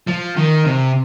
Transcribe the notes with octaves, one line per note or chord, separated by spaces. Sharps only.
F3
D#3
C3